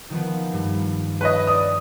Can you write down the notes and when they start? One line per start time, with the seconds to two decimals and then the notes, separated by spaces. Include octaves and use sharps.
0.10 D#3 F3 B3
0.53 G2
1.21 B4 C#5 D#5
1.47 D5 D#6